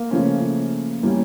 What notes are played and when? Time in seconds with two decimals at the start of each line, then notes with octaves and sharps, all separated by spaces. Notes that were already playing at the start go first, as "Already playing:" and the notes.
Already playing: A#3
0.11 C#3 F3 A3 C#4
1.03 E3 G3 A#3 C#4